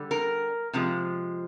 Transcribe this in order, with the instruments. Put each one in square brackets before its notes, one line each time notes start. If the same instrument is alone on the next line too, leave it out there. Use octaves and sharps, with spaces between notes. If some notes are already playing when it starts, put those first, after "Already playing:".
Already playing: [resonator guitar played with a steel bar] D3 G3
A#4
C3 F3 G#3